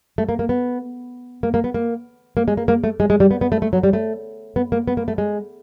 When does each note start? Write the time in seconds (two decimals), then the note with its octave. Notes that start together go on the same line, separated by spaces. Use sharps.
0.18 A3
0.29 A#3
0.39 A#3
0.49 B3
1.43 A#3
1.54 A#3
1.64 B3
1.74 A#3
2.37 A#3
2.48 G#3
2.57 A#3
2.68 A#3
2.84 A3
3.00 G#3
3.10 G#3
3.20 G3
3.31 B3
3.41 B3
3.52 A3
3.62 A3
3.73 F#3
3.83 G3
3.93 A3
4.56 B3
4.72 A#3
4.88 B3
4.97 A#3
5.08 A3
5.18 G#3